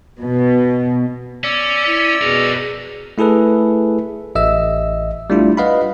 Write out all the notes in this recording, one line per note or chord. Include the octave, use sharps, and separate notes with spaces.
B2
C#4 D5 E6
E4
B2 G#4 A#4 C#5
A3 E4 G#4 A4 B4
A1 D#5 E5 E6
G3 A3 D4 E4 F4
B4 D#5 F5 F#5 B5